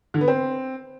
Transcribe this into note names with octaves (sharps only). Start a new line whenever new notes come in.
D3
B3
C4